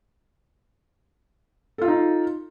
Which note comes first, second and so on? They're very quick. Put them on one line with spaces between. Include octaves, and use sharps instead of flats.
A4 F4 F5 D#4